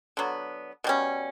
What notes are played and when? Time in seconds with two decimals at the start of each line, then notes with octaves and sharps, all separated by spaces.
0.17 D3 F#3 B3
0.84 B2 G3 C#4